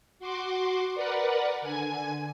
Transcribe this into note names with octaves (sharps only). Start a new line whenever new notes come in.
F#4 C6 D6
A#4 B4 D5 F#5
D3 G#5 G#6